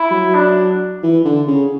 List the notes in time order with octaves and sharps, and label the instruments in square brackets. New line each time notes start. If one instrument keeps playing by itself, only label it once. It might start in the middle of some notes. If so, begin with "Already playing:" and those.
Already playing: [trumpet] E4
[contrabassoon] F#3
[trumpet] D4
[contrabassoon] E3
D3
C#3